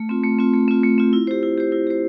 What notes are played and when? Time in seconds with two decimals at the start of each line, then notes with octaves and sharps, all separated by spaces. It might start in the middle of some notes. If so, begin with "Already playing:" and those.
Already playing: A3
0.09 C4 F4
0.24 A3
0.39 C4 F4
0.54 A3
0.68 C4 F4
0.83 A3
0.98 C4 F4
1.13 E4
1.27 G4 C5
1.43 E4
1.58 G4 C5
1.72 E4
1.87 G4 C5